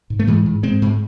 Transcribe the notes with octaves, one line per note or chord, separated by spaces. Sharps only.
G#2
A3
G#2 E3 G#3
G#2
G#2 G#3 C4
G#2